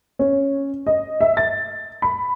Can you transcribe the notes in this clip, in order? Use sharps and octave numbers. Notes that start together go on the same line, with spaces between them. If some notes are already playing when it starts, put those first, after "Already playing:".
C#4
D#5
E5
A6
B5